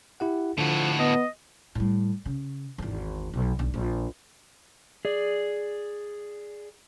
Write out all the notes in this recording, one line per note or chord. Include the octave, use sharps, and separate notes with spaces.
E4 G4 F#5
A2 D3 F3 F#4
B3 D#5
A2 G3
C#3
G#1 E2
B1
B1 D3
A#1
G#4 D5